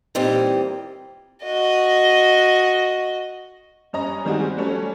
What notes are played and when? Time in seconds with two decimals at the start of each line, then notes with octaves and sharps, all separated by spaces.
0.15 A#2 E3 G3 C4 D#4
1.43 F#4 D#5
3.93 G2 C#4 D#5 A#5
4.25 D#3 G3 G#3 C4 F#4 G#4
4.57 F#3 G3 A3 C#4